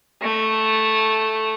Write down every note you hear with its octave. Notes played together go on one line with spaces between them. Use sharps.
A3